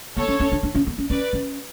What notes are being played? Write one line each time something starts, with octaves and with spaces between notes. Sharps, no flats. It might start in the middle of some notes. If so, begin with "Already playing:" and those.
B3 A4 C#5
C#4
C#4
D4
D4
C#4
B3
C#4
C#4 B4 D5
C#4